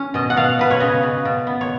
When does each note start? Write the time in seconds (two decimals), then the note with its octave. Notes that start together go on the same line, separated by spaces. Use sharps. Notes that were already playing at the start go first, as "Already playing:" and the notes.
Already playing: C#4
0.14 B2 D#5
0.30 F#5
0.37 B2 F5
0.59 B2 B4
0.71 C#5
0.80 C#3 D#5
1.03 C#3
1.25 B2
1.47 B3
1.61 C#5